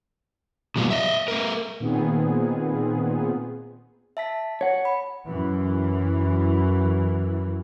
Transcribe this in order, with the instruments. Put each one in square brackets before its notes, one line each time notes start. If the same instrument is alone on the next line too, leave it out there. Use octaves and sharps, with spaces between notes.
[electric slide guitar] B2 F3 G3 G#3 A#3 B3
D#5 E5
A3 A#4
[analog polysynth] A#2 D#3 B3 C4 G#4
[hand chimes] E5 A5 B6
[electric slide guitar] C#5 F#5 [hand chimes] C#7
[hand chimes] B5
[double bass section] F#2 E3